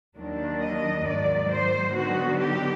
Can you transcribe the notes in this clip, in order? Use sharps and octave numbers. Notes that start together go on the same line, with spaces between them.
D#2 D#3 F#3 A#3 D4
D#5
G#2 D#3 F#3 A#3 D5
C5
D3 F#3 B3 D#4 F#4
G4